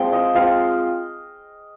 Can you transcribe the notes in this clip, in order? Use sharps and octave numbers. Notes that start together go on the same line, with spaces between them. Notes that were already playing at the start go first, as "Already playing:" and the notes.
Already playing: F3 G#3 C4 F4 G5
D#5
F3 G#3 C4 F4 F5